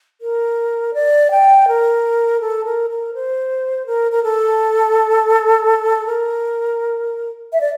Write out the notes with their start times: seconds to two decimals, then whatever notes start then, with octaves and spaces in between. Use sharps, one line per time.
0.21 A#4
0.94 D5
1.31 G5
1.68 A#4
2.41 A4
2.65 A#4
2.90 A#4
3.14 C5
3.86 A#4
4.12 A#4
4.23 A4
6.06 A#4
7.53 E5
7.61 D5